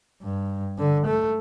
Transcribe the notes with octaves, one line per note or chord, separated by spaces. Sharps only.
G2
D3
A3